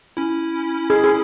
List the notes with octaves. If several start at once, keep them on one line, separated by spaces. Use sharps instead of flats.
C#4 E4
G#4
G#4